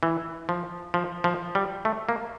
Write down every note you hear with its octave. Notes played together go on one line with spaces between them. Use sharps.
E3
F3
F3
F3
G3
A3
A#3